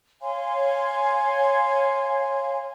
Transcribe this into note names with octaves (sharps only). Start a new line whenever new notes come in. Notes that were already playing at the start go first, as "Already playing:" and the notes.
C#5 F5 G#5 C6